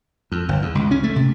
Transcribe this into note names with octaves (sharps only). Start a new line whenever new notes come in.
F2
G1
E2
C#2
C#4
A3
C3